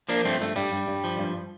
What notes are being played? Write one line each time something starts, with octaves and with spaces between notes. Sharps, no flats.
F3 A#3 D4
G2 A3 C4
G2 A3
G2 G3
G2
G2
F3
G2